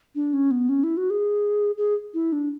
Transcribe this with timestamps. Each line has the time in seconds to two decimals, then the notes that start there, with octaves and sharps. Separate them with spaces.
0.15 D4
0.33 C#4
0.51 B3
0.69 C#4
0.84 E4
0.97 F#4
1.10 G#4
1.78 G#4
2.14 E4
2.32 D4